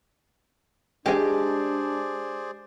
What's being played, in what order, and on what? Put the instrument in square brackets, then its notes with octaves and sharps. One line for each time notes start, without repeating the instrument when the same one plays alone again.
[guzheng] G#3 [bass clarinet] D4 [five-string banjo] G4 G#5 [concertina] G#4 C5 D5